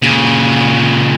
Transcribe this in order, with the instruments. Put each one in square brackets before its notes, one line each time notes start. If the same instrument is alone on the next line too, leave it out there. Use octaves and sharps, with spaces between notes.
[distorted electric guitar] A#2 C#3